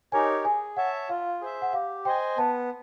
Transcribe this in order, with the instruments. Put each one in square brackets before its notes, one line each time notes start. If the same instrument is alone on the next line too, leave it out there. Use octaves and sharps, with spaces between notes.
[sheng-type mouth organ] D#4 G4 A#4 C#5 [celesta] G#5
[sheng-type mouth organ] G#4 [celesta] G#5
[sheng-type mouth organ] C#5 E5 A5 [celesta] F#5
[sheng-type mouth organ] F4 [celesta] F5
[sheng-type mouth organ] G#4 C5 E5
[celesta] F#5
[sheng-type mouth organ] G4 [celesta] F5
[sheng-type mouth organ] C5 D#5 G#5 [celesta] G5
[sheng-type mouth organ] B3 [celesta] A5